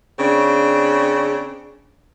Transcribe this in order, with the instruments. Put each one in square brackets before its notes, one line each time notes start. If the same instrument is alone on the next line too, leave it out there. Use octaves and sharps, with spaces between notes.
[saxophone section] C#3 C4 D4